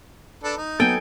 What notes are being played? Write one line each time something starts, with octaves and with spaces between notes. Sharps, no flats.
D4 A4 B4
D#4
F#3 B3 A4 G5 G#5